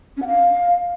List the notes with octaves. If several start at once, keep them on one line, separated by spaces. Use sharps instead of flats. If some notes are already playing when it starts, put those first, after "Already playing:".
C#4
F#5
F5